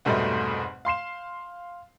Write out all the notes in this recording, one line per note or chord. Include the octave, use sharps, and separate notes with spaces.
F1 G#2 B2 G3 A3 D#4
F5 C6 C7 E7